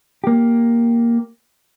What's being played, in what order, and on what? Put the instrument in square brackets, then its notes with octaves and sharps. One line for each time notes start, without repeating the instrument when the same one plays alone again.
[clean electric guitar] A#3 G4